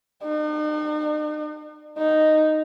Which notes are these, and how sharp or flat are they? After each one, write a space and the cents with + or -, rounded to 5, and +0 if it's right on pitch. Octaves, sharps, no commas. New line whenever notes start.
D#4 -45
D#4 -5